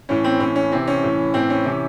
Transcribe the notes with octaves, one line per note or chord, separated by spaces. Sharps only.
A2 E3 C#4
C4
A2 E3 C#4
C#4
C3 E3 C4
C#4
A2 E3
A2 E3 C4
C#4
C3 E3